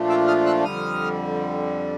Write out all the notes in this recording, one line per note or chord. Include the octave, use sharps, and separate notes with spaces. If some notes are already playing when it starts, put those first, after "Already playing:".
Already playing: A#2 F3 A3 D4 F4
D6 E6
D#6 F6
E6 F#6
F2 D3 G3 D#6 F6